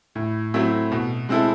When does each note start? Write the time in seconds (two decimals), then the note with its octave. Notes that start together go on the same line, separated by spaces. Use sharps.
0.15 A2
0.54 F#3 A3 C4 E4
0.92 B2
1.29 G#3 C4 E4 A4